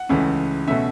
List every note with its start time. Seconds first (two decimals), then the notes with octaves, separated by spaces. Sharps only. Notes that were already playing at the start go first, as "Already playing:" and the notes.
Already playing: F#5
0.09 C#2 C#3 E3 A3 C#4
0.67 B2 A3 C#4 E5